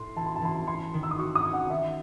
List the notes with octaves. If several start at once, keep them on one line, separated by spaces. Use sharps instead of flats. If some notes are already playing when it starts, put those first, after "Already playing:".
Already playing: A2 C6
E3 A5
C6
A5
E3 C6
A5
C#4 C6
D#3
E6
D#6
F#4 C#6
D#6
C#4
F#5
D#3 E5